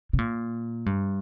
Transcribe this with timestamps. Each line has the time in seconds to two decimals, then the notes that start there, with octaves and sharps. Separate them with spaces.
0.13 C3
0.18 A#2
0.86 G2